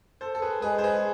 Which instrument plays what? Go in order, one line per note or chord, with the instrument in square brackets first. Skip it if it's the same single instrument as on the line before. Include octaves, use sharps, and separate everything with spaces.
[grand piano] A4 C5
A4
G#4 B4
[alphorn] G#3 [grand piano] G#4 B4
[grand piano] C5
G#4 B4